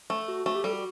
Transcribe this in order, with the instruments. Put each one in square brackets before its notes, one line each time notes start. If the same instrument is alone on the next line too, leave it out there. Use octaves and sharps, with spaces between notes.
[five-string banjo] A3
[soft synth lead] F#4
[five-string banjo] A3 [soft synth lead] F#4
[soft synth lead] G4
[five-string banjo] G3 [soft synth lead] A4
[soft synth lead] F#4